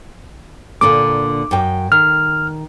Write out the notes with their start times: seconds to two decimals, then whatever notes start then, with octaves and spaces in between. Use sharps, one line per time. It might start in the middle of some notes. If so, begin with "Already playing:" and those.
0.81 A#2 D3 A#3 D6
1.51 F#2 G5
1.92 D#3 F6